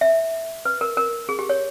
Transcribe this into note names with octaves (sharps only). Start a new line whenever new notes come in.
E5
B4
A#4
A#4
G#4
G4
C#5